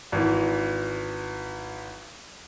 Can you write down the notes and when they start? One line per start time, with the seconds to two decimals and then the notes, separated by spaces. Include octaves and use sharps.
0.12 G#1 E3